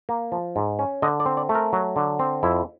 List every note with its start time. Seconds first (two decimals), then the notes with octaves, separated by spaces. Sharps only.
0.09 A#3
0.32 F3
0.56 G#2
0.79 C#4
1.02 D3 D#5
1.20 D5
1.26 C4
1.37 D5
1.49 A3
1.55 A#4
1.73 F#3
1.96 D3
2.19 C4
2.43 F2 E4